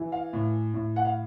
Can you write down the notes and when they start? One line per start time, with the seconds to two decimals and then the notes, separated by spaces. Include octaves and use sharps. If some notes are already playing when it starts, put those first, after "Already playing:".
Already playing: E3
0.12 F5
0.33 A2
0.74 A2
0.96 F#5
1.05 F5